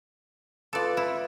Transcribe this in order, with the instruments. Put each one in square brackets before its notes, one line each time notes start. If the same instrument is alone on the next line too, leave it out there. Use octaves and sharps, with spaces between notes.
[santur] F4 B4 D#6 [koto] A4 D5
[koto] E4